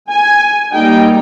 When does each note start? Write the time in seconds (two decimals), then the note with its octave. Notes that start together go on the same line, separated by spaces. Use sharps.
0.10 G#5
0.73 G3 A#3 D#4 G5